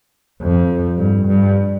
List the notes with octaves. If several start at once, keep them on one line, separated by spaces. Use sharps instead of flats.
F2
G2
G2